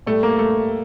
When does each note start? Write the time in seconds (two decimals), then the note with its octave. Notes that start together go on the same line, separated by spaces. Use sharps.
0.07 A2 G3 A3
0.23 A#3
0.39 A3